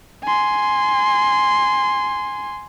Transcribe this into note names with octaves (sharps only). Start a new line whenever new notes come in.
G#5 C6